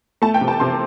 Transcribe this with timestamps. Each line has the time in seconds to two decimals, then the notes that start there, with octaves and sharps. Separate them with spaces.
0.22 A3 A5
0.34 G5
0.41 C3
0.48 A5
0.60 C3 C6